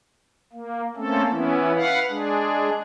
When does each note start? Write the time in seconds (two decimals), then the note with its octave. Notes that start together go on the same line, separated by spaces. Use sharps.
0.53 A#3
0.97 A3 A#3 C4 C#4 A4
1.30 E3 B3 C#4 E4
1.75 B4 F5 F#5
2.10 G#3 D4 G#4